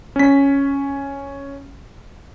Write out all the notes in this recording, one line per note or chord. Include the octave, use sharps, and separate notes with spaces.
C#4 B6